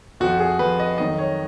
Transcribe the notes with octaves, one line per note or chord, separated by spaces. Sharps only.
F2 F3 F#4
G#4
F2 F3 B4
D#5
F2 D#3 F#3 D#5
C#5